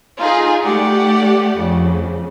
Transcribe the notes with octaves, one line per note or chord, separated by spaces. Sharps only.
D#4 F4 G#4
A3 G4 D5 F#5
F2 C#3